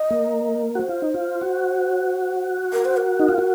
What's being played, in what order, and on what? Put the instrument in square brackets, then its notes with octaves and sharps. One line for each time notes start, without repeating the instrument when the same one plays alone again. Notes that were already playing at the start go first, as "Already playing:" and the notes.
Already playing: [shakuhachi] D#5
[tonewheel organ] A#3
[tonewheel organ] F#4 [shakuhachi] C5
[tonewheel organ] F4
D#4
F4
F#4
[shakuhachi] A#4
C5
A#4
[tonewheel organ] D#4
F4
F#4